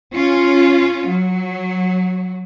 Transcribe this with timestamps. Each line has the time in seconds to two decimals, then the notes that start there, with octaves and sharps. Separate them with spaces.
0.13 C#4 F4
1.08 F#3